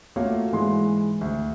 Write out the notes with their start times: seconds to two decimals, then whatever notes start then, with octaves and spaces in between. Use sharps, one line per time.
0.16 A3 A#3 F4 F#4 C#5 F5
0.52 G#2 E3 G#3 C6
1.21 D2